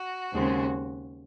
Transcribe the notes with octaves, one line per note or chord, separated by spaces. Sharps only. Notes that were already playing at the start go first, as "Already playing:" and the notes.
Already playing: F#4
D#2 C#3 G#3 C4